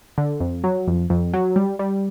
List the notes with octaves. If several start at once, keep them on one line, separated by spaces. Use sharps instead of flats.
D3
F2
F#3
F2
F2
F#3
G3
G3